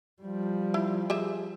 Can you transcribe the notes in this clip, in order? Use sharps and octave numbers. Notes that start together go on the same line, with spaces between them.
F3 G3
E4
G4 G#4 E5